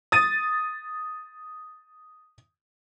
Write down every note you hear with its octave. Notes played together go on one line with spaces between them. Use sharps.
D#6 A6 D#7